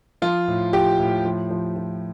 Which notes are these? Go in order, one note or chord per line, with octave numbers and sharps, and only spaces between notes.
F3 F4
A2
F3 G4
A2
F3
F3
F3